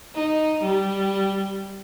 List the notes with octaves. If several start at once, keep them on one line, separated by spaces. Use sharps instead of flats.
D#4
G3